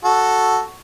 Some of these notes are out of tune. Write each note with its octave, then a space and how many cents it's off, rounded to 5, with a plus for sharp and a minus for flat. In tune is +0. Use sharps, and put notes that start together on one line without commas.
F#4 +0 A4 +0